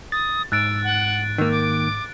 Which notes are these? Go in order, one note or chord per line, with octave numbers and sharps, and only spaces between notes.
D#6 A6
G#2 E6 F#6 A6 D7
F#5
D#3 A#3 E6
D6